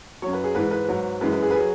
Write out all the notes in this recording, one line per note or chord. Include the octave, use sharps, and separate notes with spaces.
F#2 F#3 C#5
B4
G#4
G#2 E3 G#3 B4
B4
G#2 F#3
F#2 E3 G#3 B4
B4
G#4
B4
G#4
F#3